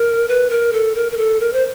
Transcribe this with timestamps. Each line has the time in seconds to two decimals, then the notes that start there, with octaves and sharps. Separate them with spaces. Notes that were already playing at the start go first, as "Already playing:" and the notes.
Already playing: A#4
0.28 B4
0.50 A#4
0.73 A4
0.95 A#4
1.12 A#4
1.17 A4
1.40 A#4
1.53 C5